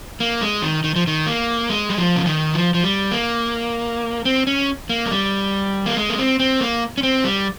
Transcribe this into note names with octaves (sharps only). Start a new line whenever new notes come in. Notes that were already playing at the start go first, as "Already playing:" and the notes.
A#3
G#3
D#3
D#3
F3
D#3
A#3
G#3
G3
F3
C#3
D#3
F3
F3
G3
A#3
C4
C#4
A#3
G#3
G3
A#3
G#3
A#3
C4
C4
A#3
C#4
C4
G3